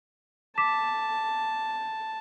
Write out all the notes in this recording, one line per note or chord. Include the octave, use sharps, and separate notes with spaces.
A5 D6 B6 E7